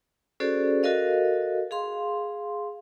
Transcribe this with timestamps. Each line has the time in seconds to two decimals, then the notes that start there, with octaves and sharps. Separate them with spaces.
0.40 C#4 F#4 G#4 A4 C5 D5
0.83 F#4 A4 A#4 D#5 F5
1.71 G#4 F5 C6